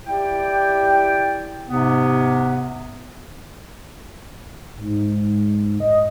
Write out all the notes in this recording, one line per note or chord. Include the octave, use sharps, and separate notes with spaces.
E4 G4 D5 G5
G#2 C3 B3
G#2
D#5